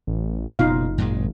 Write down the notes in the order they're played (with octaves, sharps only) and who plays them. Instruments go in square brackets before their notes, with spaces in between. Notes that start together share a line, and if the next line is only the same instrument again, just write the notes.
[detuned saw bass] A1
[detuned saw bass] F#1 [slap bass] B2 [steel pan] D#4 F4 F5
[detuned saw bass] G#1 [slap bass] F#2 A#2 G#3